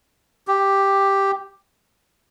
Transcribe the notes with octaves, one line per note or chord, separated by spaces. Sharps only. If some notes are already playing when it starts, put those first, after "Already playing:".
G4